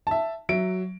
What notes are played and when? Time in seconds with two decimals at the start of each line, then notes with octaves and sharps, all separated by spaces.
0.07 E5 A5
0.49 F#3 E5 D7